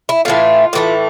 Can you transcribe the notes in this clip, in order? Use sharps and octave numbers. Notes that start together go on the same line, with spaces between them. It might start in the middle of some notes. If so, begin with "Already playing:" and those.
E4
A2 E3 A3 F4
A2 E3 A3